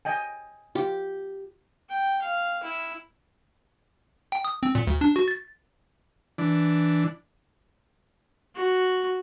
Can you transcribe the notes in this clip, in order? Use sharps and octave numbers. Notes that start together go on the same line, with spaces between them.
D#5 G5 G#5
F4 G4
G5
F5
E4
G5
D#6
C4
A#2
D2
D4
F#4
A6
E3 D4
F#4